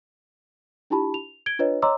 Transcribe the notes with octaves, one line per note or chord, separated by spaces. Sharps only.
D4 E4 F4 G4 A5 B5
F7
G#6 D7 G7
D4 F4 B4 C#5 D#5
C#5 D#5 A#5 C6 D6 E6